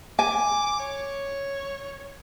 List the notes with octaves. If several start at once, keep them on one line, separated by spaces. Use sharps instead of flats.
G#5 D6
C#5